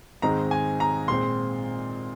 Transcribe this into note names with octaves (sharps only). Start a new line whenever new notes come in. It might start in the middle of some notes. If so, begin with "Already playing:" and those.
G#2 D#3 G#3 C4 D#4 A#5
G#5
A#5
A#2 G#3 C4 C6